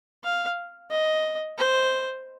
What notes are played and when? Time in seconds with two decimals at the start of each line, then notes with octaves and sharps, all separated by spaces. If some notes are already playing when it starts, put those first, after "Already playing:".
0.24 F5
0.90 D#5
1.58 C5